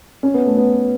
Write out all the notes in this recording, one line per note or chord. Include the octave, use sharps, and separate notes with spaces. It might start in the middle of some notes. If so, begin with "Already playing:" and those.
C#4
B3
A3
B3